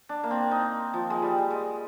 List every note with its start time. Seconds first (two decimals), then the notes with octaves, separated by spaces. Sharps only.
0.09 D4
0.24 A#3
0.31 C4
0.51 D#4
0.94 F3
1.10 G#3
1.22 G3
1.50 G#3